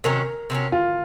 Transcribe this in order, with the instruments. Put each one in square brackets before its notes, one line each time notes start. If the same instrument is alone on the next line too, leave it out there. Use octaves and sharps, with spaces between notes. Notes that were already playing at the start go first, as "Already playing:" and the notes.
[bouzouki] C3 D#3 F#3 C#4 [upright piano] A#4
[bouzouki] C3 D#3 F#3 C#4
[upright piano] F4